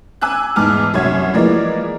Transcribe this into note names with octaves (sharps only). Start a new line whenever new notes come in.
G#5 D6 E6 F#6
E2 G#2 A5 D6 F6
C2 F#2 F#4 C#5 G#6
E3 F3 G#3 A#3 A#4 D5